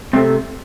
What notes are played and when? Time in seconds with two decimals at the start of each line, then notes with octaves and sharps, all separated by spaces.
0.13 C3 A3 C4